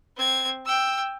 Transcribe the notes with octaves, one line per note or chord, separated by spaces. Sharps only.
C4 G#6
G5 E6